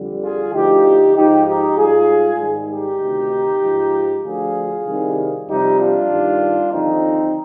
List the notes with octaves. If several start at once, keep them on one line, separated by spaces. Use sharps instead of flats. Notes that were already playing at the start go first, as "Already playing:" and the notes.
Already playing: F2 D3 G3
F4 G#4
D2 D3 F3 D#4 G4
G#2 F3 D#4 G4
D#4 G4
G#2 G3 F4 G#4
G#2 D#3 G3
D#4 G4
D2 C3 D#3
G#2 F3
D2 D3 F3 F4 G#4
C2 C3 D#3 G3
F2 C3 G3 D#4 G4
D4 F4
G2 D#3 G3
D#2 D3 F3 C4 D#4